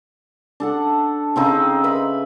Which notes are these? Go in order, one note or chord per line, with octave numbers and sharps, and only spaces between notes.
D4 A4 F#5
C#3 C4 D#4
B4 E5 B5